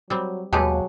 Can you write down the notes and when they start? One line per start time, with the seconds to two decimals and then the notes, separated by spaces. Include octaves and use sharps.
0.10 F#3 G3 C4
0.53 D#2 B2 F#3 G#3 G4 G5 A5